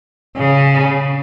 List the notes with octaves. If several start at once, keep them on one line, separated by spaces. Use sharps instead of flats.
C#3